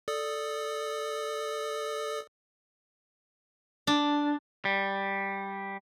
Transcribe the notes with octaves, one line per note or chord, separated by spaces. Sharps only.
A4 D5 D#6
D4
G3